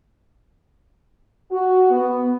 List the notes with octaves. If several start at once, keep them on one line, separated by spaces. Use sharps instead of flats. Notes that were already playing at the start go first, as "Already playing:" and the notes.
F#4
B3